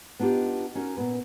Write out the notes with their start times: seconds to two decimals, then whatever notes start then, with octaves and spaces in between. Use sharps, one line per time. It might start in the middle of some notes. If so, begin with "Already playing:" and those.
0.20 B3 D4 D#4 F4 G4
0.75 C#4 D#4 F#4 A#4
0.97 A#2 B3 B4